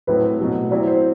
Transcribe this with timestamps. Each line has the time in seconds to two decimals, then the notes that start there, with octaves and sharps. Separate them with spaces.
0.07 A2 F#3 A3 C4 E4 B4
0.39 B2 F#3 A3
0.71 F#3 C4 E4 D5
0.87 C5